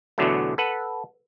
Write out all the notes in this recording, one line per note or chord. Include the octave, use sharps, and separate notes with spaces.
E2 B2 D3 F#3 A3
A4 B4 F#5